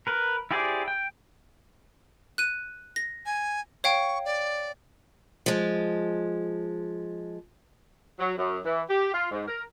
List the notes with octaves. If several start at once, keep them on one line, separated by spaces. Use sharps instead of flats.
A#4 B4
E4 G4 G#4 C5 D5
G5
F#6 D#7
A#6
G#5
C#5 F5 G5 C#6
D5
F3 G#3
F#3
F#2
E3
G4
F4
G#2
A#4